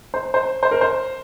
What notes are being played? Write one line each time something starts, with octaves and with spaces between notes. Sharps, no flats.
C5
C5
C5
A#4
C5